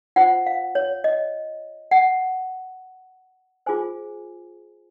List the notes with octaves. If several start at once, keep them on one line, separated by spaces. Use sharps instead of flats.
F4 C5 F#5
F5
C#5
D#5
F#5
F4 G#4 C5 G#5